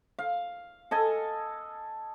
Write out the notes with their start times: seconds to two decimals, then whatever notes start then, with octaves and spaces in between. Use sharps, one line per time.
0.19 F5
0.91 A4 D#5 G#5